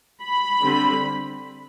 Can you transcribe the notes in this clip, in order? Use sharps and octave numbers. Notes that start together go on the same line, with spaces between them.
B5
D3 G3 C4